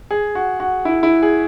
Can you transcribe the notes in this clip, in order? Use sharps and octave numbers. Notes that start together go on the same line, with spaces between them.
G#4
F#4
F#4
E4
E4
G#4